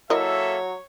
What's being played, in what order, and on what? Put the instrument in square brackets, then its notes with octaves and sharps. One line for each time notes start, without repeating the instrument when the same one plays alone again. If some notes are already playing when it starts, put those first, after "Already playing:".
[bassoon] F#3 [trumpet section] A#3 A4 E5 [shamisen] E4 A#4 D#5 [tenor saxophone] C#5